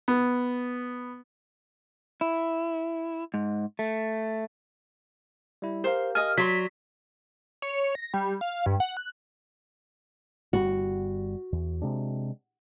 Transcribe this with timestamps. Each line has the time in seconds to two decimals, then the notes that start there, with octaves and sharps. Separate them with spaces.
0.08 B3
2.21 E4
3.34 G#2
3.79 A3
5.62 G3 E4
5.84 G4 A#4 C5 F5
6.15 D#5 G#5 F6
6.38 F#3 D5 C6 B6
7.62 C#5
7.95 A#6
8.14 G3
8.41 F5
8.66 G2
8.80 F#5
8.97 F#6
10.53 G1 G3 F#4
11.52 E2
11.82 C3 G#3 D4